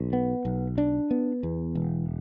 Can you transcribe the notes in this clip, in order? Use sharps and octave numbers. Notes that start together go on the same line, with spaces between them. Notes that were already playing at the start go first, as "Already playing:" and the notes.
Already playing: B1
B3
B1
D4
B3
E2
E1